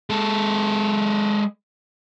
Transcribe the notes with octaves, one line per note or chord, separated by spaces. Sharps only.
G#3 A4